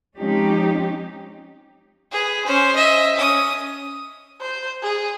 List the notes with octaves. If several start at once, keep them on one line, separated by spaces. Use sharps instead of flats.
F3 G#3 C4 C#4 D#4 G4
G#4 B4
C#4 C5
D#5 E5
C#4 D#6
C5
G#4